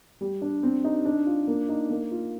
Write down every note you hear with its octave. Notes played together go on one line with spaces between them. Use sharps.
G3
D4
C4
D#4
D4
F4
A#3
D#4
A#3
F4